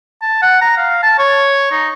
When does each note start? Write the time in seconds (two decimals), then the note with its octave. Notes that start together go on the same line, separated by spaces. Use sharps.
0.22 A5
0.42 F#5
0.61 A#5
0.77 F5
1.03 A5
1.19 C#5
1.72 D#4